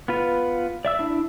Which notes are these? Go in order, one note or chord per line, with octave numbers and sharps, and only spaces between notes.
B3 F4 B4
D5 E5 E6
D4 E4